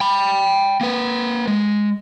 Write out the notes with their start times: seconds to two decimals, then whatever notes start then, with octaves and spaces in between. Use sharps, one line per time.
0.01 G5 B5
0.81 A#3 B4
1.47 G#3